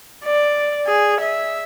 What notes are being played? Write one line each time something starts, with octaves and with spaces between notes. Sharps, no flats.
D5
G#4
E5